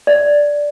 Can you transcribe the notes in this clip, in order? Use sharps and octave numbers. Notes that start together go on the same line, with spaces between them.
D5